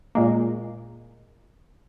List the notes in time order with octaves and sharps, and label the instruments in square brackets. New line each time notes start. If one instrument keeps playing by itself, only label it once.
[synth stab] A#2 G#3 A#3